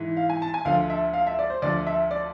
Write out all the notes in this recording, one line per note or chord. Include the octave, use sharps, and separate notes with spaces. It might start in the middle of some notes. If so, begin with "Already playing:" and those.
Already playing: G#2 E3
F5
G#5
A5
G#5
D2 D3 F3 F5
E5
F5
E5
D5
C5
D2 D3 F3 D5
E5
D5